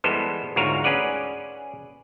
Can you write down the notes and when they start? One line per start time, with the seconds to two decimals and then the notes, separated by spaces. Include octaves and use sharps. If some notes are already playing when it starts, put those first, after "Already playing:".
0.04 E3 G3 G#3 B3 A4 C5
0.56 D2 G#2 F4 F#4 A#4 C#5
0.84 C#4 G#4 B4 D5 F#5